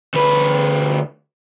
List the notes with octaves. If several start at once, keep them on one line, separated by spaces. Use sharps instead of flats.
D2 B4